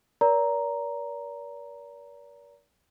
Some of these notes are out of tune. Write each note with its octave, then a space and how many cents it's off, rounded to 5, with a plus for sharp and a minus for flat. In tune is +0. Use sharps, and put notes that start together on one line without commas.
A#4 +35 D5 -40 A#5 +0